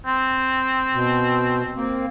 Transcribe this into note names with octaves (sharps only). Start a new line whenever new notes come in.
C4
B2
A#3 C4